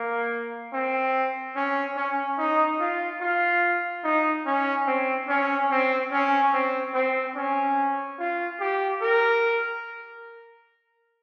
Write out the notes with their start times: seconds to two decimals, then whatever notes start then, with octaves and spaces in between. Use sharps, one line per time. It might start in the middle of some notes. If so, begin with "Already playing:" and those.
Already playing: A#3
0.73 C4
1.56 C#4
1.97 C#4
2.38 D#4
2.80 F4
3.21 F4
4.04 D#4
4.46 C#4
4.87 C4
5.28 C#4
5.71 C4
6.12 C#4
6.53 C4
6.94 C4
7.36 C#4
8.19 F4
8.60 G4
9.02 A#4